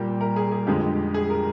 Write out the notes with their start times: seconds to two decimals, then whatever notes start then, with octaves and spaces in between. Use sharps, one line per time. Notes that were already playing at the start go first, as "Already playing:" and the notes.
Already playing: A#2 G3 A#3 G4
0.21 A#4
0.36 G#4
0.52 G#4
0.67 F2 D3 F3 G#3 G4
1.14 G#4
1.30 A#4